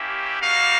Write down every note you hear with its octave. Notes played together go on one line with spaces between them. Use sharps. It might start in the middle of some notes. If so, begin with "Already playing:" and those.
Already playing: A#3 C#4 E4 G4
G3 A#3 D#4 F#4 F5